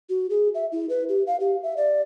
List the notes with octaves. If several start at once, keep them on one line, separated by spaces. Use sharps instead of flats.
F#4
G#4
E5
E4
B4
G4
F5
G4
E5
D5